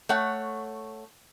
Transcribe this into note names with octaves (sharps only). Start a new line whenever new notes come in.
A3 C#5 F#5